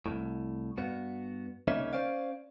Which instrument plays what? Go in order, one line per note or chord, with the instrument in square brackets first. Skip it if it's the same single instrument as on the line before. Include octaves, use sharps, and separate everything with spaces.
[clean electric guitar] C2 F2 A2
G2 B3 F#4
C2 C#3 A#3 C#4 D#4 E5
C#4 C5 D5 F5